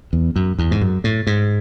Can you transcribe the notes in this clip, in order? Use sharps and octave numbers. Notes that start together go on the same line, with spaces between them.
E2
F#2
E2
G#2
F#2
A2
G#2